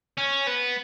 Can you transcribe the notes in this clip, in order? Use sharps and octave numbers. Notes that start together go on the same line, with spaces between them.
C#4
B3